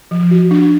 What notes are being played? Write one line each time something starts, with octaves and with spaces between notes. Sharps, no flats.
F3
F#4
D4